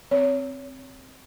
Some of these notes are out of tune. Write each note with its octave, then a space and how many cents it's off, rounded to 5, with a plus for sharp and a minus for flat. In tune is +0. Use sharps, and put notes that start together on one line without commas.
C4 +0 C#5 +25